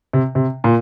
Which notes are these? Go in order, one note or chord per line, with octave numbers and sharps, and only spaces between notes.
C3
C3
A#2